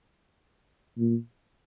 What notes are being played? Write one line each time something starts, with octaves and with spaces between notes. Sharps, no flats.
A#2